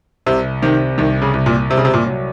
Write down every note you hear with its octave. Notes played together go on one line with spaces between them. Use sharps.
C2 C3
C3 D#3
C2 D#3
C#3
C2
A#2
C2 C3
C#3
C3
A#2
F#3